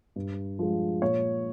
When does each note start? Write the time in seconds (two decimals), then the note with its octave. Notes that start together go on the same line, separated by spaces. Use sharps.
0.16 G2
0.59 F3 G#3
1.02 A#2 C#5